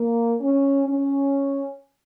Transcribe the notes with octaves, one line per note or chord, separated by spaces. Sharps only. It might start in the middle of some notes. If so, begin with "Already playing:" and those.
Already playing: A#3
C#4
C#4